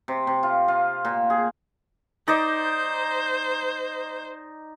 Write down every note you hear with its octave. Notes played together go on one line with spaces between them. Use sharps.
C3
C3
F4
F4
A#2
G#4
D#4 C5 D5 D#5